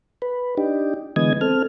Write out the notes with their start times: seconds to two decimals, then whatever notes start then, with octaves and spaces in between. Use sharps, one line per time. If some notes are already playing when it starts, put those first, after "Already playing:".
0.22 B4
0.57 D4 D#4 G4
1.16 D3 E3 G#3 B3 D#5 G#6
1.41 C4 A4 F6